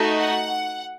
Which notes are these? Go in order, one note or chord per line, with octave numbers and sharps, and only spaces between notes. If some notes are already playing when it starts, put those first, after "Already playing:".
Already playing: A3 D#4 F#4
F#5